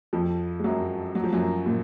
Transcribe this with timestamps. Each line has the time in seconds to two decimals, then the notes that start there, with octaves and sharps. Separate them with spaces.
0.13 F2 F3
0.59 G#3
0.64 F#2 F#3
1.15 F#3
1.24 F3
1.33 F#2 F#3
1.66 A#2